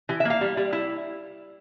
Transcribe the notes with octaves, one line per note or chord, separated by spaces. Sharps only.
E3 G4
E5
A#3 F5
G3
G3
E4